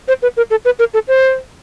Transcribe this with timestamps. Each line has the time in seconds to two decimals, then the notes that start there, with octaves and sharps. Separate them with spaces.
0.08 C5
0.22 B4
0.37 A#4
0.50 A4
0.65 B4
0.79 A#4
0.94 A4
1.08 C5